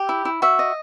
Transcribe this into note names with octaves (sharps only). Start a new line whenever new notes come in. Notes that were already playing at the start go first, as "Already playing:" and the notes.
Already playing: G4
E4
E4
F#4 E5
D#5